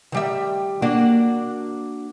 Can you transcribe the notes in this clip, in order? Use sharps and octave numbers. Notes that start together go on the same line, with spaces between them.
D#3 G3 E5
A#3 D4 F#4